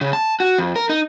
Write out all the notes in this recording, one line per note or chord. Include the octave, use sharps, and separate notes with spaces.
C#3
A5
F#4
F2
A#4
D#4